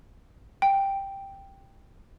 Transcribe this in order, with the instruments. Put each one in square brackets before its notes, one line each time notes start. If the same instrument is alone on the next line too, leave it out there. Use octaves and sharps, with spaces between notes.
[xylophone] G5